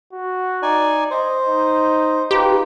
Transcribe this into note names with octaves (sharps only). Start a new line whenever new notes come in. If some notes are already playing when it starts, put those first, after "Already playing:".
F#4
D#4 D5 G#5
C5 D#5
D#4
D#4 F4 G4 B4